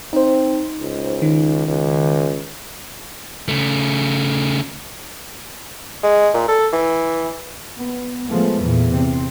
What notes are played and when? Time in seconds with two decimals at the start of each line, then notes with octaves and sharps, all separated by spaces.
0.13 C4 D#4 C5
0.80 C#2
1.22 D#3
1.68 C#2
3.49 C#3 A3
6.03 G#3
6.34 A#2
6.48 A4
6.73 E3
7.78 B3
8.29 F3 G#3 A3 B3
8.60 E2 A#2
8.92 C3 C4